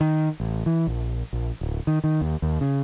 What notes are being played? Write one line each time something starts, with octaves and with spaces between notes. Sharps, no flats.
D#3
A1
E3
A#1
A#1
D1
D#3
D#3
D#2
D#2
C#3